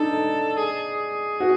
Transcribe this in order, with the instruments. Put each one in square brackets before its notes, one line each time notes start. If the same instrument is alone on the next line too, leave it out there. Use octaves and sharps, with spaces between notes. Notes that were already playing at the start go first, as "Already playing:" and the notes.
Already playing: [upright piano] D4 D#4 [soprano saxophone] A4
[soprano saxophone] G#4
[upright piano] F#4